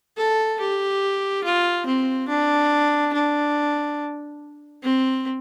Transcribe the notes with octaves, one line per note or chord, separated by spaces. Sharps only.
A4
G4
F4
C4
D4
D4
C4